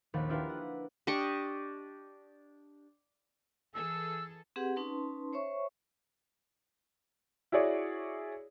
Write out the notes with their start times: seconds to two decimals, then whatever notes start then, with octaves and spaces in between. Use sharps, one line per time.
0.14 A#1 D#2 D#3 F#5 B5 A6
0.29 D4 E4 F4 G4 A#4 B4
0.49 F#5
1.07 D4 G4 D#5 C#6
3.74 E3 G#4 A4 E6
4.56 C4 G4 G#4 B4 F#5
4.76 C#4 D#4 B4 A5 C6
5.33 C5 C#5 E5 C#6
7.52 E4 F#4 G#4 C#5 D5